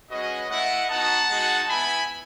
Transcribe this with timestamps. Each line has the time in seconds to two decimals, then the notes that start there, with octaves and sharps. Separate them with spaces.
0.10 G#3 C#4 F#4 B4 D#5
0.50 A3 E4 D#5 F#5
0.90 B3 D#4 F#4 F#5 A5
1.29 G#3 D#4 F#4
1.68 B3 E4 G#5 B5